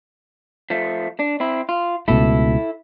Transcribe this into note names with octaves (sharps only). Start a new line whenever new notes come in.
F3 A3
D4
C4 E4
F4
C#2 B2 A3 E4 A4